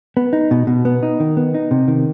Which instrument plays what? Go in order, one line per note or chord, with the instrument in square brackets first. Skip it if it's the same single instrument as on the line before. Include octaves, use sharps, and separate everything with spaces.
[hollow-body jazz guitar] B3
D#4
B2
B2
B3
D#4
D#3
B3
D#4
C3
D#3